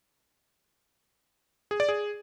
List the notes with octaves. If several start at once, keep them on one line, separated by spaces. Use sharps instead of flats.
G#4
D5
G#4